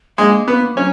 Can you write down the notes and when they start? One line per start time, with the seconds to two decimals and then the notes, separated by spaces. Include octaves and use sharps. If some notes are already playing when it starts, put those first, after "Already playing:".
0.18 G#3 A#3
0.47 A#3 B3
0.77 F#3 C#4